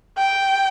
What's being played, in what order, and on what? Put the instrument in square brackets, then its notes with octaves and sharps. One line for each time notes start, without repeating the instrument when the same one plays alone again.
[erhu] G5